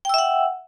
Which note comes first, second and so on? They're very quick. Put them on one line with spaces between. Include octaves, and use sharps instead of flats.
G5 E6 E5 F#5